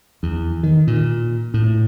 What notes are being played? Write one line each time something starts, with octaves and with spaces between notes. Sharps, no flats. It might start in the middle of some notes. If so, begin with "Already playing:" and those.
E2
D#3
A#2
A2